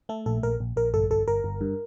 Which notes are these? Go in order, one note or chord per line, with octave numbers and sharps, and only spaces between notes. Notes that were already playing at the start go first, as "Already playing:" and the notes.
A3 A4
A#1 A4
A#1 A#4
A#1
A#1 A#4
G1 A4
G1 A4
G1 A#4
G1
G2